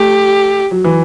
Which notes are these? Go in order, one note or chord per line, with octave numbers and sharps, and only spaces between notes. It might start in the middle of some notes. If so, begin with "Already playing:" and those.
Already playing: A3 G4
F#3
E3